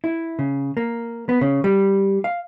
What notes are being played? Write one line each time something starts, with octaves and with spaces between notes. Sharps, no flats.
E4
C#3
A#3
B3
C#3
G3
F5